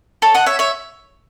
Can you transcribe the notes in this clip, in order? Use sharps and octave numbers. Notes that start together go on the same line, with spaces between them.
A4 C#5
D#5 F#5
C#5 E5
C#5 E5